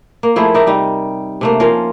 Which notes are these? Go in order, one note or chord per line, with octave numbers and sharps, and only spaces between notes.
A#3
F3 A3 E4 G#4
D#4 A#4 D5 E5
C3 G3 D#4
C3 A3 A#3
F3 C#4 F4 A#4